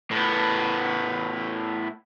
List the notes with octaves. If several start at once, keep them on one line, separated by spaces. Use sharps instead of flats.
A2 B3